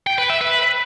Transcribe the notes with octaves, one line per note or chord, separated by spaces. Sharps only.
G5
B4
E5
B4